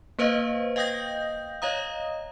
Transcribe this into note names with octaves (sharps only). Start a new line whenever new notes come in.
A#3 B4 C5 D#5 F5
D#5 F5 G5 D#6 G6 A#6
C#5 D#5 F5 A#5 D#6